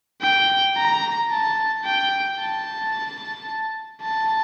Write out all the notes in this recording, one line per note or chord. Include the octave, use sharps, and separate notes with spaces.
G5
A#5
A5
G5
A5
A5